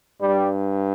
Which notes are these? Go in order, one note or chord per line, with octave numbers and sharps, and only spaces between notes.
G2 G3